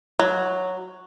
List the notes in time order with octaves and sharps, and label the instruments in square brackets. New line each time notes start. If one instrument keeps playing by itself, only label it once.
[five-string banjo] F#3